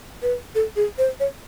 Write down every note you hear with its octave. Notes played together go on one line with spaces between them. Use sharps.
B4
A4
G#4
C5
C#5